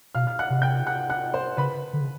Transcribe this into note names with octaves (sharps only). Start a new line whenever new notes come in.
B2 F5 F6
F6
F#5 F#6
C3
G5 G6
F#5 F#6
F#5 F#6
C5 C6
C#3 B4 B5
D3
C#3